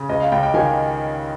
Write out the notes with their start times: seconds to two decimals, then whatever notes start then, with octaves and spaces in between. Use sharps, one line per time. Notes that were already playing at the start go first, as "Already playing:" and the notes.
Already playing: C#3
0.09 C#2 D#5
0.20 F5
0.32 C#2 G5
0.43 G5
0.54 D#3 G#5